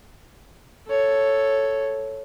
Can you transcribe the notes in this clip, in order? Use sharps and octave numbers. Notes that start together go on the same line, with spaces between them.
A4 C#5